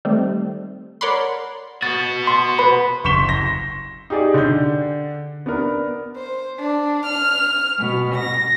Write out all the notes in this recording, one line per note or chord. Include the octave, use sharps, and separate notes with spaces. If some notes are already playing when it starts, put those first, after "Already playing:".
D#3 G3 A3 C4
A#4 C#5 D5 F#5 B5 C6
B3 F#4 A6
C6 A6
B4 B5
F#1 C6 C#6 B6 E7 G7
A#6
D#4 G4 G#4 D5
D3 D4 G6
B3 D4 A#4
C5
D4
F6
B2
A#6